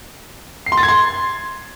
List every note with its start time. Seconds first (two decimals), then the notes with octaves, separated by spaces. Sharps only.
0.66 C7
0.72 C6
0.77 A6
0.83 G#6
0.88 C6